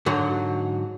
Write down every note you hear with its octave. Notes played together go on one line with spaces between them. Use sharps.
G#2 D3 F#3